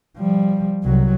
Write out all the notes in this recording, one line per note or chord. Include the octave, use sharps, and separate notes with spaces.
F3 G3
C2 F#3